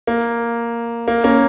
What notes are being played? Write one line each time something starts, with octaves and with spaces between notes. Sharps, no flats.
A#3
A#3
A#3 C#4